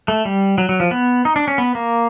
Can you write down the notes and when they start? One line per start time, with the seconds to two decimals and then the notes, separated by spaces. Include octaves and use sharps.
0.08 A3
0.25 G3
0.58 F#3
0.69 F#3
0.80 F3
0.91 B3
1.25 D#4
1.36 D4
1.48 C#4
1.58 B3
1.75 A#3